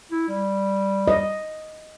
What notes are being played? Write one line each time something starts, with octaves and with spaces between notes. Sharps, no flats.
E4
G3
D#5